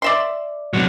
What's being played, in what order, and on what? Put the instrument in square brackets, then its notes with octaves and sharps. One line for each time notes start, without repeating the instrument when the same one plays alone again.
[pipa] D5 E5 C6
[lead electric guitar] C3 F#3